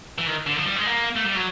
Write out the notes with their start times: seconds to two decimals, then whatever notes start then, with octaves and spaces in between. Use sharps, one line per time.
0.18 E3
0.27 D#3
0.47 D3
0.56 F3
0.66 G3
0.76 G#3
0.86 A#3
1.16 A3
1.25 G3
1.35 F#3